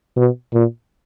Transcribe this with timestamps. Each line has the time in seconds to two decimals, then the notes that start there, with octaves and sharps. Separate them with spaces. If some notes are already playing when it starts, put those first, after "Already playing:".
0.17 B2
0.53 A#2